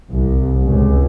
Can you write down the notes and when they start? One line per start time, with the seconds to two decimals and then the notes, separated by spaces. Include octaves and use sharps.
0.11 C2
0.63 C#2